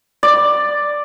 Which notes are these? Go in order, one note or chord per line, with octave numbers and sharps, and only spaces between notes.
D5